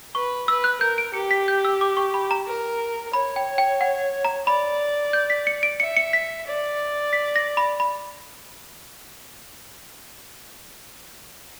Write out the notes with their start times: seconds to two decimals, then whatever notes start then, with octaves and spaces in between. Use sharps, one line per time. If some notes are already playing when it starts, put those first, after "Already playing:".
0.14 B4 C#6
0.48 B4 E6
0.64 F#6
0.81 A#4 G6
0.98 D7
1.14 G4 C#7
1.31 B6
1.48 G6
1.65 E6
1.81 D6
1.97 C#6
2.14 B5
2.31 A#5
2.47 A#4
3.13 C#5 B5
3.36 G5
3.58 G5
3.81 F#5
4.25 A#5
4.47 D5 B5
5.13 G6
5.30 B6
5.47 C#7
5.63 D7
5.80 E5 C#7
5.96 C#7
6.13 B6
6.47 D5
7.13 B6
7.36 A#6
7.57 B5
7.80 B5